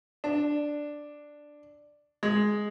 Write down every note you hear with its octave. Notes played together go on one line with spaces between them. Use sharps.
D4
G#3